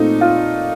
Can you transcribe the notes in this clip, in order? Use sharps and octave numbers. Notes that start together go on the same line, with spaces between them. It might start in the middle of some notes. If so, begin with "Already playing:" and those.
Already playing: A#2 A3 C4 D#4
F4